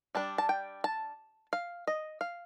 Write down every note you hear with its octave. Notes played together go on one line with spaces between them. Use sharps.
G3 D4 A5
A5
G5
A5
F5
D#5
F5